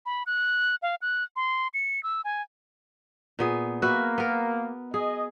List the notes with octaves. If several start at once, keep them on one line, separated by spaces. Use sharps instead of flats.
B5
F#6
F5
F#6
C6
C#7
E6
G#5
A#2 B3 G#4
A#3 F#4 B4 E5
B3 A#4
G#4 D#5